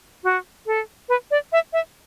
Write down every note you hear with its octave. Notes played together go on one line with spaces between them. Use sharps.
F#4
A4
B4
D5
E5
E5